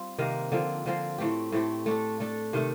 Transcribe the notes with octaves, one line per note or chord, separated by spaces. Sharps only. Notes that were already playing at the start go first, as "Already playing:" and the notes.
Already playing: G3 C4 F4
C3 D#3 A#3
D3 F3 C4
D3 F3 C4
A2 A3 C4 G4
A2 A3 C4 G4
A3 D4 A4
A3 D4 A4
C3 D#3 A3